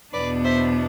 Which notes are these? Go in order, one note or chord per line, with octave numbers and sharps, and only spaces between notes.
E2 B2 B3 D4 B4 D5
C5 E5